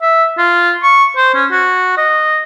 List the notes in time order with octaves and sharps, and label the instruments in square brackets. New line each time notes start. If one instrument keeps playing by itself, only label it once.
[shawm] E5
F4
C#6
C5
C#4
F#4
D#5